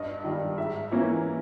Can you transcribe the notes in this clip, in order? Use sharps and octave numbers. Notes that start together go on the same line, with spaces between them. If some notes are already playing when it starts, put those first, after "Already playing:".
Already playing: G2 D#5
D#3 G3
G#2 E5
E3 A#3 C#4 E4